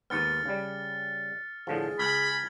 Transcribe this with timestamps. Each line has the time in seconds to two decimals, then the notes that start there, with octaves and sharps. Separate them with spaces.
0.10 D#2 G#2 B3 F6 A6 C#7
0.46 C#3 G3
1.67 A2 D3 F3 G#4
1.99 C#2 G#5 B5 F6 G#6 F#7